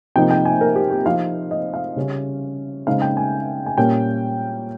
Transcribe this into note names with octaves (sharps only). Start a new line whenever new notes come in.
C3 F3 A#3 D#4 G5
G5
G#5
A#4
G4
G4
F3 C4 D#4 F5
D#5
F5
C#3 G3 C#4
C#3 G#3 C4 D#4 F5
G5
G#5
G#5
A#2 G3 A#3 C#4 G5